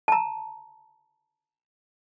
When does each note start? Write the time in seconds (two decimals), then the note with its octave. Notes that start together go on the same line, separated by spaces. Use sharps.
0.08 A5 A#5